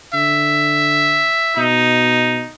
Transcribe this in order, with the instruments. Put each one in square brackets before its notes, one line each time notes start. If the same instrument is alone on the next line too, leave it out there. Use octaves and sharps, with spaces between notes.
[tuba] D3 [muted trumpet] E5
[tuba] B2 [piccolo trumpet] D#4